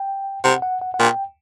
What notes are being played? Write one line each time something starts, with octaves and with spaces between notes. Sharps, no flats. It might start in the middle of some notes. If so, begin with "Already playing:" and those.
Already playing: G5
C3 F#5
F#5
F#5
F#5
A#2 G5